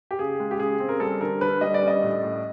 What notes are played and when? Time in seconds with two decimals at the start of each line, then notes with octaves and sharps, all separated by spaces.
0.11 G4
0.19 C#3 G#4
0.40 G#3
0.51 G4
0.59 C#3 G#4
0.80 C4
0.89 A#4
1.00 G3 A4
1.21 D3 A#4
1.41 D3 B4
1.61 G3 D#5
1.74 D5
1.82 C#4
1.88 D#5
2.03 A2
2.23 A2